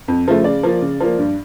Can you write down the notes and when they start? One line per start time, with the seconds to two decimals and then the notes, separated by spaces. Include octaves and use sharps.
0.08 F2
0.27 C#3 F3 A3
0.44 C#3 D5
0.63 F3 A#3
0.81 C#3
1.00 F3 A#3
1.18 G2